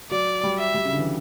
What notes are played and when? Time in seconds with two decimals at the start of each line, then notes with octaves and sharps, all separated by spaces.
0.11 F#3 D5
0.43 G3
0.59 E5
0.74 G3
0.85 C#3
0.92 D3
0.99 E3